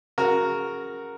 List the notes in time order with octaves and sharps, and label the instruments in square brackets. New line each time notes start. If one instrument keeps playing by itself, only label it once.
[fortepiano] C#3 F#4 A#4